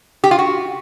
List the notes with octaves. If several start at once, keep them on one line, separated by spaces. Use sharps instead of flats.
G4
F4
F#4